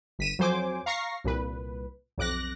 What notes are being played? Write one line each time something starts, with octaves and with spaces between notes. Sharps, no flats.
G1 B6 D#7 E7
F2 F#3 C5 G#5 D6
F5 A#5 C#6 A#6 C7
C2 A#2 B4
B1 F2 D6 F#6 A#6